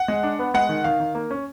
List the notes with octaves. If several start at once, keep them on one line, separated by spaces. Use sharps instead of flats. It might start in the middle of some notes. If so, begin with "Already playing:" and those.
Already playing: F#5
G#3
D4
B3
G#3 F#5
D#3
D#3 F5
D#3
A#3
C#4